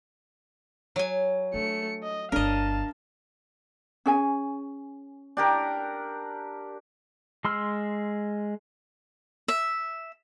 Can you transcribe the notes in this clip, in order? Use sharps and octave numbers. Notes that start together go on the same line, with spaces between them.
F#3 G#5
A3 D4 C#7
D#5
G1 B3 D4 A#4 D#5 F5 A5
C#4 G#4 G#5
D4 G4 A#4
G#3 C6 E6 F6
E5